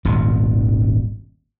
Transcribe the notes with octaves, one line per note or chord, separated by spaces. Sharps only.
D#1 G#1 B2